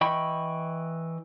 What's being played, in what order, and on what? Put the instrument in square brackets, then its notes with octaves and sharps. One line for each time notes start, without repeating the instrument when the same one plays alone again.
[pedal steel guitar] E3 D#5 G5 B5 C#6